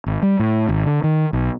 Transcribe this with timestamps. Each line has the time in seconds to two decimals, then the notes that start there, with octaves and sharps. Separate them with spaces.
0.06 G#1
0.22 G3
0.39 A2
0.69 G#1
0.86 D3
1.04 D#3
1.33 B1